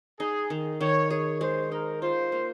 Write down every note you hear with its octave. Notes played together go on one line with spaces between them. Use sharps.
D#4 G#4
D#3
D#3 C#5
G#4 C#5
G#3 C5
D#4 A#4
F4 C5
A#3